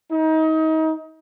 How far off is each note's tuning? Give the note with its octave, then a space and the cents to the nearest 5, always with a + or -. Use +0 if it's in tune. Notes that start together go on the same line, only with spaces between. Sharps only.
D#4 +30